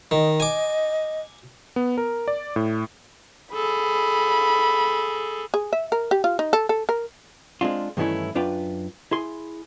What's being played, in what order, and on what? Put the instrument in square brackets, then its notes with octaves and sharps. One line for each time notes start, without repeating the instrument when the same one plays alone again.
[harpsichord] D#3 [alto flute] D#5
[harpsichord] G#5 D6
[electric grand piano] B3
A#4
D5
A2
[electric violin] G#4 A4 [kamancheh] B5
[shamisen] G#4
E5
A#4
G4
F4
D#4
A4
A4
A#4
[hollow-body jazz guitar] G#3 C4 D4 F4
G2 D#3 E3 A3 C#4 E4
F#2 D4 F4 B4 G5
E4 G#4 C6